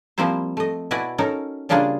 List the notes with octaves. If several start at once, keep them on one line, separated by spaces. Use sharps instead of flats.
F3 G3 A#3 C4 E4 C5
A3 D#5
B2 E4 F#4 B4 D5 G#5
C#4 D#4 A4 A#4
C#3 G3 A#3 D4 F4 G#4